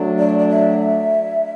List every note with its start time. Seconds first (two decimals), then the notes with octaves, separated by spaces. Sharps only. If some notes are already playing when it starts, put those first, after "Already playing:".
Already playing: F#3 A3 D4
0.19 D5
0.38 D5
0.49 E5